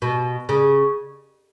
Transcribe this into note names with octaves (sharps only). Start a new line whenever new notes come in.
B2
C#3